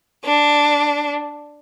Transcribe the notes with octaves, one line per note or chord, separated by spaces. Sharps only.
D4